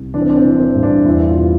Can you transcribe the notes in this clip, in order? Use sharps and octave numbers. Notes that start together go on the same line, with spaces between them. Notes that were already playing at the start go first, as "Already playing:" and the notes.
Already playing: C2
E3 D4
C4
D4
C4
E3
D4
C4
G2
D4
E2 E4
F4
B2